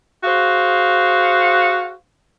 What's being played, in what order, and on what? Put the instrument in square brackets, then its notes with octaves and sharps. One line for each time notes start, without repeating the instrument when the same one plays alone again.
[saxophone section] F#4 G#4 C5 F5